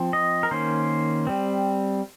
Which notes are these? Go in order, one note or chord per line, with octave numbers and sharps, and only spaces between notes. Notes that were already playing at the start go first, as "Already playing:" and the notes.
Already playing: F3 C4
D#5
A#4
D#3 A#3 C#4 C5
G3 C4